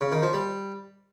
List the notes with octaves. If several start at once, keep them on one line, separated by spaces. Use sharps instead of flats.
C#3
D#3
F3
G3